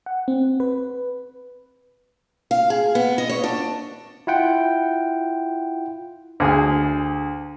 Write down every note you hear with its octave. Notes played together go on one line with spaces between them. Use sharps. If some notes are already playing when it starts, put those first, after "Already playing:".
F#5
C4
B4
F5
G#4
B3
D#5
C#5
D4
E4 F4 F#5 G5
D2 G#4 G#5